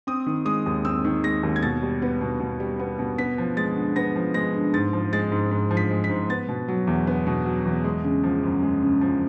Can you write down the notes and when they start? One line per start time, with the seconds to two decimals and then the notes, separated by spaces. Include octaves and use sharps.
0.07 C4 D#6
0.27 D#3
0.45 G#3 D#6
0.66 D#2
0.85 C4 E6
1.05 D#3
1.24 G#3 A#6
1.43 D#2
1.56 G#6
1.62 B2 A6
1.83 G3
2.02 B3
2.21 B2
2.40 B2
2.60 G3
2.79 B3
2.99 B2
3.18 B3 B6
3.38 F3
3.57 G#3 A6
3.76 D3
3.96 B3 A#6
4.16 F3
4.34 G#3 A#6
4.54 D3
4.74 G#2 A6
4.93 F3
5.13 G#3 A6
5.32 G#2
5.51 G#2
5.71 F3
5.77 B6
5.91 G#3
6.04 B6
6.10 G#2
6.29 B3 A6
6.48 B2
6.68 F#3
6.87 E2
7.07 B3
7.27 B2
7.45 F#3
7.65 E2
7.84 G#3
8.04 C#3
8.24 F3
8.43 F#2
8.63 G#3
8.82 C#3
9.01 F3